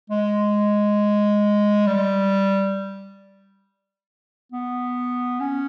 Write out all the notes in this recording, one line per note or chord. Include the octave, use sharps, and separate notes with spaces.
G#3
G3
B3
C#4